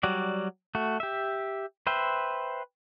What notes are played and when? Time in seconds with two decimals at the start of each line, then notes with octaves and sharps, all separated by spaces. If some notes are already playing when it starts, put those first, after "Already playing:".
0.03 F#3 G3 F#4 D5
0.75 A3 F#4
1.00 G4 E5
1.87 B4 C5 E5 G5